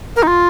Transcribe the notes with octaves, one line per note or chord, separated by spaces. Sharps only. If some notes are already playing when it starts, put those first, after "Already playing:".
A#4
D#4
F4